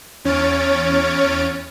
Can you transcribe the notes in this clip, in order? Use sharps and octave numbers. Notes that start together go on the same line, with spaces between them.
E2 C#4 C#5 F6 A6 D7